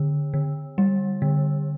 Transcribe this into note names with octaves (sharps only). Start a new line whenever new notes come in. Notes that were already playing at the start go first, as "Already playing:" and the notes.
Already playing: D3
D3
G3
D3